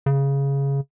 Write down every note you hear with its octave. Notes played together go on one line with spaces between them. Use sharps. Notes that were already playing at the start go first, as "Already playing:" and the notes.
C#3